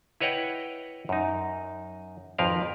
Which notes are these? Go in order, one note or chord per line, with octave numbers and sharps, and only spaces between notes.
E4 B4 C#5 D#5 F#5 G5
F#2 D#4
G#1 F2 F3 A#4 B4 F5